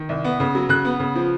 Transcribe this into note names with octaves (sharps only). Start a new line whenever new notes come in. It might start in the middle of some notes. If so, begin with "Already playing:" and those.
Already playing: D#3
C2
B3
C#3
F#3
C#3 F#6
B3
C#3
F3